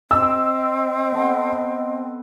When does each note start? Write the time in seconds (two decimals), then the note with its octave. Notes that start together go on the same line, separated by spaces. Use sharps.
0.11 C4 D#5 E6
1.12 B3 A4